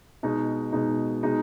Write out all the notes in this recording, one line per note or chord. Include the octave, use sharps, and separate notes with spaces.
B2 G#3 D#4
B2 G#3 D#4
B2 G#3 D#4